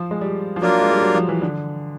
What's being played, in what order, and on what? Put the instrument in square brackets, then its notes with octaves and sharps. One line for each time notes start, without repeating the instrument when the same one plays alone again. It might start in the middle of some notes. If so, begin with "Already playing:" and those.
Already playing: [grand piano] F3
G#3
G3
F3
[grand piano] F#3 [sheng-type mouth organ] A#3 D4 F4 A#4
[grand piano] G#3
G3
F#3
F3
E3
D3